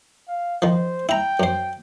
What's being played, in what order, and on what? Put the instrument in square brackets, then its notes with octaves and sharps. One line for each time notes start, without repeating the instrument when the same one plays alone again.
[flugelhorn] F5
[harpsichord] D#3 F3 [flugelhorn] C5
[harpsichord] E4 A#5 [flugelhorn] G5
[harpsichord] F#2 C5